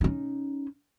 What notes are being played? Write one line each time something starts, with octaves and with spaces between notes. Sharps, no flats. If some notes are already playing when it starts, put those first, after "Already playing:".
C#4 D#4